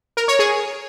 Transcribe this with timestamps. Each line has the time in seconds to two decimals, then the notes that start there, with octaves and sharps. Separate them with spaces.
0.17 A#4
0.28 C#5
0.39 G#4